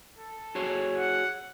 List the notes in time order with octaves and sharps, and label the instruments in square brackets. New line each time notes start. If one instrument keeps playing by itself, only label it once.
[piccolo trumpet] A4
[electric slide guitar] F#4 G#4 C#5
[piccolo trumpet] F#5